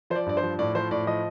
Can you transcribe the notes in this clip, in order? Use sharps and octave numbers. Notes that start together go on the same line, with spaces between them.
F3 C5
D5
G2 D5
C5
F3
A2 D5
F3 C5
A2 D5
F3 D#5